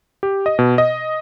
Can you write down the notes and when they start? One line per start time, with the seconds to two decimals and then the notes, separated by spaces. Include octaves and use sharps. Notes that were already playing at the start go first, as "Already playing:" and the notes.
0.23 G4
0.46 D#5
0.59 B2
0.78 D#5